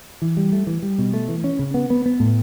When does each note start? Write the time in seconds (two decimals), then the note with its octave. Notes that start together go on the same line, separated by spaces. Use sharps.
0.22 E3
0.37 G3
0.52 A3
0.67 E3
0.82 G3
0.98 B2
1.13 A3
1.28 E3
1.44 C#4
1.59 C#3
1.74 B3
1.90 B3
2.06 B3
2.20 A2